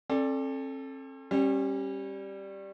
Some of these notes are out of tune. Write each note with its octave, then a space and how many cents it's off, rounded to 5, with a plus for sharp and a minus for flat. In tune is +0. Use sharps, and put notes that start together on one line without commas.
C4 +45 A4 +0 D5 +0
G3 +0 C#4 -35